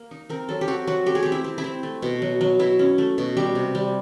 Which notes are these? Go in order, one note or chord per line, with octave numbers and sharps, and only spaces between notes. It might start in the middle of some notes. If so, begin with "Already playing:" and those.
Already playing: A#3
D#4
C4 A#4
F#3 A4
G4
C4 F#4
F#3 F#4
A3 G4
G#4
C4 G4
E4
C4
E4
C4
A3
B2
F#3
F#3
B2 E4
C#4
A3
B2
G3 G4
C3
G3